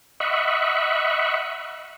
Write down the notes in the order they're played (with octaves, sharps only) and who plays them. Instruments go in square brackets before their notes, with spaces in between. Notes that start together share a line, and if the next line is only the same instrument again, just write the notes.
[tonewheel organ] D#5 E5 F#5 B5 C#6